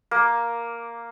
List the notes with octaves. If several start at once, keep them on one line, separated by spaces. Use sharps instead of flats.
A#3